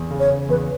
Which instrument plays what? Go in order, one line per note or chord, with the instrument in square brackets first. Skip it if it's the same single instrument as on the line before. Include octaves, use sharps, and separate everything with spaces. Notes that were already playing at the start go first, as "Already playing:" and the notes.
Already playing: [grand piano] E2
C#3
[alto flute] C#5
[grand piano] C#3
[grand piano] E2 [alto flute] B4